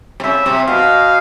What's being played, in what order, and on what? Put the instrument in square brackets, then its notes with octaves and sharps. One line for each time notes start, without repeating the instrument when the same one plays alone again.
[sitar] C3
[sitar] C#3 [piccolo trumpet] E5
[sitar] C3
[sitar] B2 [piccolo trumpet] F5